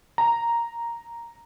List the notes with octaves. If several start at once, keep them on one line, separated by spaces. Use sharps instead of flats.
A#5